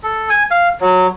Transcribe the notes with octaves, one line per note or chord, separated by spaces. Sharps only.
A4
G#5
F5
F#3